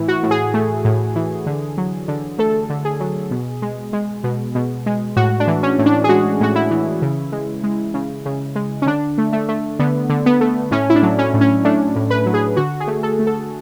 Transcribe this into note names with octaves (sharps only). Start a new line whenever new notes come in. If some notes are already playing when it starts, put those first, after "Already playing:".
Already playing: A2 E3 E4
F#4
A2
G#4
A3
A2
E3
D3
F#3
D3
A3 A4
D3
G#4
F#3
B2
G#3
G#3
B2
B2
G#3
A2 F#4
D4
E3
C#4
A2
D4
G#4
G#3 F#4
A2 F#4
E4
E3
C#3
G#3
G#3
C#3
C#3
G#3
C#4
D3 D4
A3
A3
A3
D3 B3
D3
B3
A3
A2 C#4
E4
D4
F#3
C#4
A2
C#4
A3 D4
A2
B4
F#3
G#4
D3 F#4
G#4
A3
A4
A3
A4